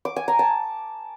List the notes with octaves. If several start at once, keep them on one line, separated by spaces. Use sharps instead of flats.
D6
G#5
A#5
A5